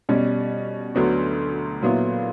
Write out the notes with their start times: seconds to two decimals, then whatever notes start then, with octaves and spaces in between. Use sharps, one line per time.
0.09 B2 G3 C#4
0.95 D2 D3 F#3 B3 F#4
1.82 A#2 F#3 B3 E4